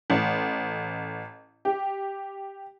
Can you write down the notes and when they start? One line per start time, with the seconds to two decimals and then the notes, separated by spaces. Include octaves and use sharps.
0.10 A1
1.65 G4